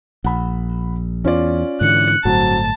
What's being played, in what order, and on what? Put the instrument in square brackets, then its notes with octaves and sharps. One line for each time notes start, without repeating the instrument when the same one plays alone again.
[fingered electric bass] A#1 [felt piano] F#5 B5
[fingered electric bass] E2 [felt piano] C#4 F4 D5
[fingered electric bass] G#2 D3 E3 [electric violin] F#6 C#7
[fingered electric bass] G1 A2 [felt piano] F#3 C4 [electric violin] A5